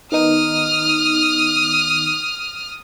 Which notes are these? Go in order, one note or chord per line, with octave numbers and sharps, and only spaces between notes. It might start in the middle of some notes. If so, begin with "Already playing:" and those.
D#3 B3 D#4 D#6 F6